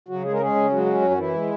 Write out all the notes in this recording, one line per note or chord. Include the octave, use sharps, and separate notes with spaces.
C#3 F#3 F#4
G#3 G#4
A#4
G#3 C#4 G#4
C#3
F#3 G#3 F#4
C#4
F#2
F#4
E3 E4
G#3